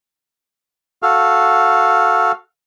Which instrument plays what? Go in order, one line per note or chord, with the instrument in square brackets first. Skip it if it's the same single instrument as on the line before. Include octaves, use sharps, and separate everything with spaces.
[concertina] F#4 A4 F5